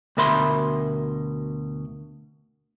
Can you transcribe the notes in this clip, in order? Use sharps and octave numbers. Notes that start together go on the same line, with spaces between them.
D2 B2 A#4 E5 B5 C6